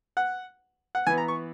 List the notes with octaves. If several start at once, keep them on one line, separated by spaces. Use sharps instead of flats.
F#5
F#5
E3 B3 G#5
A#5
C#6